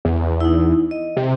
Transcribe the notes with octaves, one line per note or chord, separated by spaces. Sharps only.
E2
D#4 E4
D#5
C3